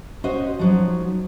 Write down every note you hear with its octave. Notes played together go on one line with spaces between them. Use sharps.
C#4 F#4 C5 D#5
F3 F#3 D#4